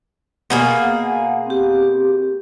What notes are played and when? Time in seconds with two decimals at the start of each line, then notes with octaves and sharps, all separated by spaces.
0.50 B2 A#3 G#4 F#5
1.46 C4 G4